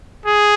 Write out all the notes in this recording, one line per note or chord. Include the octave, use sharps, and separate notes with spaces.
G#4